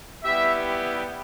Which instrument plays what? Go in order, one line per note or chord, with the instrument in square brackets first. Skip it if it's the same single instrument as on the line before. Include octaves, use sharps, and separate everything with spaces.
[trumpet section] G3 B3 E4 G4 E5